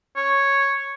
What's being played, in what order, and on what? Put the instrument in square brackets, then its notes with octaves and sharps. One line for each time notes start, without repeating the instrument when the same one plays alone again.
[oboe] C#5